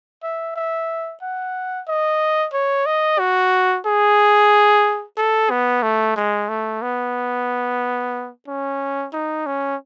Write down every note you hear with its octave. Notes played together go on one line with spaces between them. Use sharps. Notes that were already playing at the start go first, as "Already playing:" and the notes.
E5
E5
F#5
D#5
C#5
D#5
F#4
G#4
A4
B3
A3
G#3
A3
B3
C#4
D#4
C#4